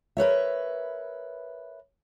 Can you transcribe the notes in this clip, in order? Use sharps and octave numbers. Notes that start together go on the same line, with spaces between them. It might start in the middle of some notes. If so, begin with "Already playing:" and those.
A#4 B4 C#5 E5